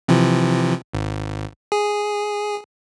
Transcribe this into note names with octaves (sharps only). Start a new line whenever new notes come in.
C3 E3 F3
G#1
G#4